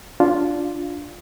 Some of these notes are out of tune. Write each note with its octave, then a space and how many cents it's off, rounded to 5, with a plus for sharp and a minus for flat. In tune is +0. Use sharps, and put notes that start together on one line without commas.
D4 +0 F4 +0